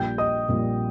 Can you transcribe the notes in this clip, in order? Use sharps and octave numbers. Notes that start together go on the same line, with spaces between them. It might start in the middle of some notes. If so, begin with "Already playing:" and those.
Already playing: A#1 A#2 G3 G5 G6
D#5 D#6
A#1 A#2 G3